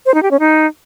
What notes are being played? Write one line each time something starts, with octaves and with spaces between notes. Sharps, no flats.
C5
D#4
G4
C#4
D#4